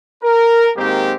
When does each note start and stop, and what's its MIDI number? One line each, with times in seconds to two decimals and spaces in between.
0.23 0.71 70
0.76 1.14 44
0.76 1.14 51
0.76 1.14 58
0.76 1.14 60
0.76 1.14 67